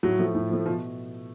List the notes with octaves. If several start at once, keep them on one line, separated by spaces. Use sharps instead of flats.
A2 F#3
F3 A3
A2
F3 A3
B2 F3